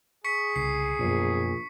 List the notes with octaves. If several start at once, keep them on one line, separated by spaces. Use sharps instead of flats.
G#4 C#6 B6 C#7
C2 C#3 C7
A#1 F#2 B2